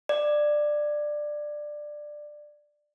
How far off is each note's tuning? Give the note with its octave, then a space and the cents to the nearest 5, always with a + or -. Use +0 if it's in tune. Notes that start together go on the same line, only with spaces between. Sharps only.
D5 +15